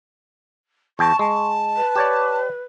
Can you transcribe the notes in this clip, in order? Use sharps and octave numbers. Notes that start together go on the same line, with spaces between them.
E2 G5 A5 C#6
G#3 A5
B4
G4 C#5 D5